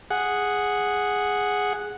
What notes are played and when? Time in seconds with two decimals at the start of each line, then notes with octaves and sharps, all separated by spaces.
0.11 G#4 F#5